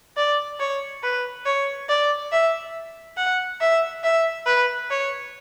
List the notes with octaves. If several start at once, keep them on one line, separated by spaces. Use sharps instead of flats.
D5
C#5
B4
C#5
D5
E5
F#5
E5
E5
B4
C#5